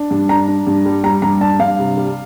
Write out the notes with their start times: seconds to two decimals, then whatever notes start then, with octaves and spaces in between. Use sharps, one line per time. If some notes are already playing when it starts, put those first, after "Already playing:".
Already playing: D4
0.11 G2
0.29 D4 A#5
0.48 D4
0.67 G2
0.86 G3
1.04 G3 A#5
1.22 G2 A#5
1.41 D4 A5
1.60 G2 F5
1.79 C3
1.97 G3